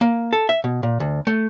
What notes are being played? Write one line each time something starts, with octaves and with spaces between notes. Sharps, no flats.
A#3
A4
E5
B2
A#2
D2
A3